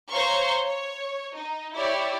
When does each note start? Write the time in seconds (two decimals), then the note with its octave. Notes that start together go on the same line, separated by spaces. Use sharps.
0.12 C5 C#5 F5 A#5 C6 C#6
0.65 C#5
1.36 D#4
1.76 E4 G4 C#5 D5